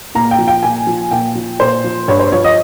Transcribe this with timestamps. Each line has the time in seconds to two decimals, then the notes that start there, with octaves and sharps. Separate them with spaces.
0.15 A#2 A#5
0.31 G5
0.38 F3
0.48 G5
0.63 A#2 G#5
0.87 F3
1.11 A#2 G5
1.35 F3
1.60 A#2 C5
1.84 F3
2.08 G2 C#5
2.20 C5
2.32 F3 C#5
2.44 D#5